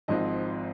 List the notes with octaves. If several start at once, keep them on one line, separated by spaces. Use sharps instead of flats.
G#1 G#2 F3 C4 D#5